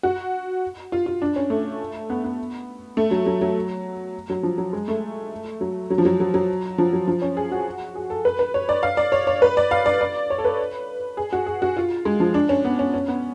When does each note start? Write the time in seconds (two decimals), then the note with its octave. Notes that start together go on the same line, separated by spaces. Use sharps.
0.03 F#4
0.92 F4
1.06 F4
1.22 D4
1.36 C#4
1.50 A3
2.10 B3
2.24 B3
2.97 A3
3.11 F#3
3.26 F#3
3.41 F#3
4.30 F#3
4.43 F3
4.58 F#3
4.73 G#3
4.88 A3
5.61 F#3
5.90 F#3
5.98 F3
6.05 F#3
6.20 F#3
6.34 F#3
6.78 F3
6.93 F#3
7.07 F3
7.22 C#4
7.37 G#4
7.52 F#4
7.95 G#4
8.10 A4
8.25 B4
8.39 B4
8.54 C#5
8.69 D5
8.83 F5
8.97 D5
9.12 C#5
9.27 C#5
9.42 B4
9.57 D5
9.71 F5
9.86 D5
10.01 D5
10.30 C#5
10.38 A4
10.45 B4
11.17 G#4
11.33 F#4
11.46 G#4
11.62 F#4
11.77 F4
12.05 G#3
12.20 F3
12.34 D4
12.49 C#4
12.65 B3
12.79 C#4
12.94 C#4
13.08 B3